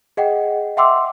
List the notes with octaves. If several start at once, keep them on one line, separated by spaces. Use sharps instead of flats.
G#4 D#5 F#5 G5
E5 F#5 G5 C6 D6 E6